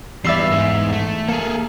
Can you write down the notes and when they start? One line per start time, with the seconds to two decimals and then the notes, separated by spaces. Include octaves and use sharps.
0.25 E2 G3 B4 D5 E5 E6 C7
0.50 G#2 G#3
0.93 A3
1.28 A#3 G#4 A4